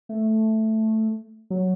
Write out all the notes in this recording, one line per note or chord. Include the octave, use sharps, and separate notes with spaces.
A3
F#3